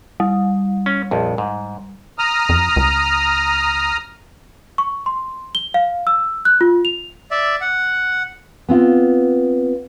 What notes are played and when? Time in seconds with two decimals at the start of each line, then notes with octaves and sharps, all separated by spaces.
0.20 G3
0.86 C#4
1.11 A#1 F2
1.38 G#2
2.18 A#5 D#6 F6
2.49 F2
2.76 C#2
4.78 C#6
5.06 C6
5.55 G7
5.74 F5
6.07 E6
6.45 F#6
6.61 F4
6.85 F7
7.31 D5 E5
7.61 F#5
8.69 B3 C4 F4